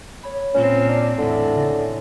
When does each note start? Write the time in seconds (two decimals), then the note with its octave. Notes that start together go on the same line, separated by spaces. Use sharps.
0.23 C#5 B5
0.54 A#2 C4 C#4
0.89 D4
1.18 E2 A2 D3 D#4 B6
1.55 C#3 D#4 A#6